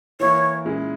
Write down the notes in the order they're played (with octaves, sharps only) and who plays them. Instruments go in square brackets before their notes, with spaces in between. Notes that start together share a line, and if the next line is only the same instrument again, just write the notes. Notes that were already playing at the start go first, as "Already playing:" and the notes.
[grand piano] E3 A#3 E4 [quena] C#5
[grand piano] A#2 G#3 C#4 E4